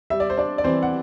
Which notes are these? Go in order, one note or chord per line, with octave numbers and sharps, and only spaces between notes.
G3 E5
D5
C5
D4 D5
D5
E3 C4 C5
F#5